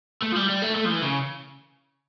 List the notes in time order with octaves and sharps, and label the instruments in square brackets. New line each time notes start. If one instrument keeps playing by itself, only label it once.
[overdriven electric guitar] A3
F3
G3
G3
A3
A3
F3
E3
C#3